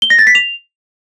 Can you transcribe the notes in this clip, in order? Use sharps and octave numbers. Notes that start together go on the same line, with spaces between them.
G7
A#6
A6
B6
F7